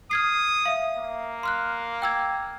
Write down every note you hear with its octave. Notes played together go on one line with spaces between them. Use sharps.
D#6 F6 G#6 C7
E5 F5
A#3
C6 F6 F#6
G5 E6 G#6